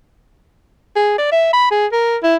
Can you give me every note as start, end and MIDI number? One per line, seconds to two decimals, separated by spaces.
0.96 1.15 68
1.18 1.27 74
1.32 1.48 76
1.53 1.70 83
1.71 1.87 68
1.92 2.17 70
2.23 2.36 64